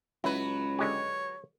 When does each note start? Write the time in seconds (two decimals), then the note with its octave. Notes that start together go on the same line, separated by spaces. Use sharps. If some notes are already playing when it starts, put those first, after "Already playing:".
0.24 C#2 F#3 E4 B4
0.79 D3 G#3 G4 C#5